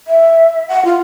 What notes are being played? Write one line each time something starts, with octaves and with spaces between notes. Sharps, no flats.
E5
F#5
F4